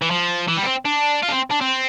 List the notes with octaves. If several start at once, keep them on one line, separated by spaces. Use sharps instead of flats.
E3
F3
E3
G3
B3
C4
D4
F4
D4
C4
D4
C4